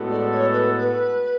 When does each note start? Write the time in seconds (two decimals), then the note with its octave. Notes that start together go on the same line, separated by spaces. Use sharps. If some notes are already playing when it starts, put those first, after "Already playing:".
Already playing: A2 G#3 B3 F#4 A4
0.11 D5
0.31 C#5
0.53 B4
0.78 B4